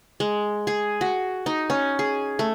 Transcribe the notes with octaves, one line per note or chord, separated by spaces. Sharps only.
G#3
G#4
F#4
D#4
C#4
G#4
A3